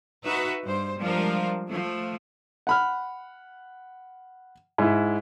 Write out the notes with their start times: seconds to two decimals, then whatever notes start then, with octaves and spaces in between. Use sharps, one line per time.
0.25 D#4 F#4 B4 E5
0.64 G2 C5
1.00 F3 G3 G#3 D4 F4 A#4
1.69 F3 A3
2.67 F#5 B5 F6
4.78 G#2 E4